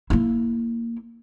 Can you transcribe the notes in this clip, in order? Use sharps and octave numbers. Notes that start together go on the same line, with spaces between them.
A#3 E4